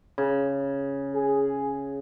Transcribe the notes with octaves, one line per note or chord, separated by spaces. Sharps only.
C#3
G#4